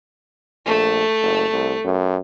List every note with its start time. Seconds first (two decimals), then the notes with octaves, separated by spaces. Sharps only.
0.66 A#1 A3
1.22 F#1
1.53 C2
1.84 F#2